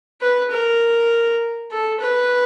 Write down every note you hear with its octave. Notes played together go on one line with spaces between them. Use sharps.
B4
A#4
A4
B4